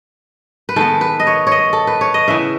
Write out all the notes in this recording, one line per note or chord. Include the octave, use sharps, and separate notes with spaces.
B4
D#3 G#3 B3 A4
B4
D#5
C#5
C#5
D#5
A4
B4
C#5
D#5
C#3 E3 B3 E5